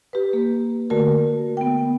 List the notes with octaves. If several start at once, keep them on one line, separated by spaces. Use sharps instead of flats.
G4 B4
A#3
D3 A3 F#4 A#4
B3 G5